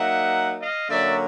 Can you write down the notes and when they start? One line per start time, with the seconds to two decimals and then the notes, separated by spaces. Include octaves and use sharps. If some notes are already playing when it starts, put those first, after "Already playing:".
Already playing: F#3 A#3 D#4 E5 F#5
0.61 D#5 F5
0.89 D3 F#3 A#3 C#4 D5 E5